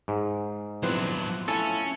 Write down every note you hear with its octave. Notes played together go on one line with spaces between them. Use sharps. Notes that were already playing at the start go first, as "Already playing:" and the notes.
G#2
F3 F#3 B3 C4 D4 E4 C5
A3 C#4 E4 F4 A4